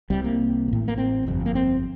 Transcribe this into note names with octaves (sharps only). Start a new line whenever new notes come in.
C2 C3 G3
A#3
A1 A2
A#3
C4
G1 F2 C3
A#3
C4